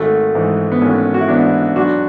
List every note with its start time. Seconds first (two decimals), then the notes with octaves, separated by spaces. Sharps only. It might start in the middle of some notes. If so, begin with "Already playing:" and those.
Already playing: G#1 A3
0.35 G#2 E3
0.72 B3
0.81 G#1 A3 C#4
1.14 F#4
1.21 E4
1.28 G#2 E3 B3 D4
1.76 B1 D4 F#4